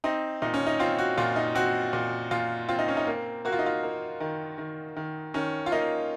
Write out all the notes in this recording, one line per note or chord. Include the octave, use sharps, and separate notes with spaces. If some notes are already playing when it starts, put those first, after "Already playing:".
C4 D#4
A#2 D#4
C#4
D#4
C4 F4
F#4
A#2 F4
D#4
C4 F#4
A#2
A#2 F4
C4 F4
D#4
C#4
D#4
A#3
A#3 F#4
F4
D#4
F4
A#3
D#3
D#3
D#3
D#3 C#4
F4
A#3 D#4